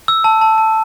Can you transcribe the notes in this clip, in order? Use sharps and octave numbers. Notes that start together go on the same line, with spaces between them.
E6
A5
A5
A5